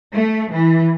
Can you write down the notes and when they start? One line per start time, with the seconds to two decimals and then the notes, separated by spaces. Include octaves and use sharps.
0.13 A3
0.51 E3